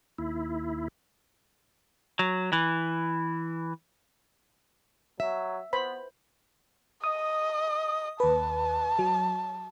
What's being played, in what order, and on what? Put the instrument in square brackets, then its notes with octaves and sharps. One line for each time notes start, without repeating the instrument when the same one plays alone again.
[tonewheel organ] D#2 E4
[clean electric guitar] F#3
E3
[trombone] F#3 [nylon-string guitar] E5
[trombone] B3 [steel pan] B4 C5 B5
[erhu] D#5 [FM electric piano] D#6
[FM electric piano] D#2 B4 [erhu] A5
[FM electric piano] F#3